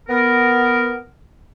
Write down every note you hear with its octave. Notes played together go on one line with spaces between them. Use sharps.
B3 A#4